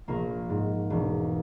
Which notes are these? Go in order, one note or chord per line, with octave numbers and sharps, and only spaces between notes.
A#1 A#3
G#2
E1